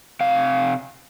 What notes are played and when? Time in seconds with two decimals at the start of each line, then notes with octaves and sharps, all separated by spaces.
0.21 C3 F5